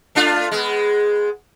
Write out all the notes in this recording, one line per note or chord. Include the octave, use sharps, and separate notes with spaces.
A3 D4 F4
G#3 B3